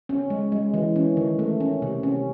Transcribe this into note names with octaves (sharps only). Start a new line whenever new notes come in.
C#4
G#3
G#3
E3
C#4
D#3
A3
C#4
C3
C#4